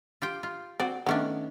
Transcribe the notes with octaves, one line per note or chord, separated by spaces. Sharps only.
F4 G4 G5
F4
C4 F#4 D5
D#3 A3 B3 C#4 D4